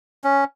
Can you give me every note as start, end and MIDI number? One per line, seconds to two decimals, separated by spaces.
0.24 0.44 61